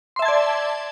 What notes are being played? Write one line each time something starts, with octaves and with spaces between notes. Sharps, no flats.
D5 E5 A5 C6 G#6